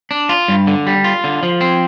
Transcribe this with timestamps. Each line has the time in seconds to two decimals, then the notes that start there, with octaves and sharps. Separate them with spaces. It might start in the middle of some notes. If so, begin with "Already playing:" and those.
0.11 D4
0.29 F4
0.48 G2
0.67 D3
0.87 G3
1.04 F4
1.24 D3
1.43 F3
1.61 C4